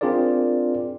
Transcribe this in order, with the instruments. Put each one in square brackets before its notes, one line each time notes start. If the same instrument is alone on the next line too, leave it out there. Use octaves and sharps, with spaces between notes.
[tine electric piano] C4 D4 F4 G#4 A#4 D5